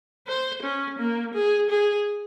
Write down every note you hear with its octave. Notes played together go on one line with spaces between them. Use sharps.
C5
C#4
A#3
G#4
G#4